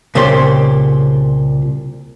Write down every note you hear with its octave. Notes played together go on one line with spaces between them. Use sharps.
C2 A#2 C#3 G4 D5 C6